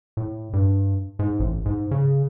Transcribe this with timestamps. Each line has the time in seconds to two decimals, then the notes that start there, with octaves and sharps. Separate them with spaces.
0.17 A2
0.53 G2
1.19 G#2
1.40 A1
1.66 G#2
1.91 C#3